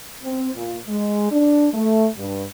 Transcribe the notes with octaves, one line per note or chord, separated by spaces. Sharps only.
C4
A#2
G#3
D4
A3
G2